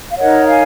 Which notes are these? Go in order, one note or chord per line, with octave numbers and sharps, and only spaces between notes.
F5
D#4 A#4 C#5 D#5 F#5
F5 G#5